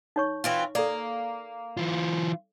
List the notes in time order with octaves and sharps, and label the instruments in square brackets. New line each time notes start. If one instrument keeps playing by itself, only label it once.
[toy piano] D#4 C#5 C#6
[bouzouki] E3 C4 F4
[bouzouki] A#3 [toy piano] A4 D5
[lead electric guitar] E3 F4